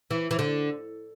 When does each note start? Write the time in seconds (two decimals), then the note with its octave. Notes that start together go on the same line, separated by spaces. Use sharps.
0.11 E3
0.31 E3
0.39 D3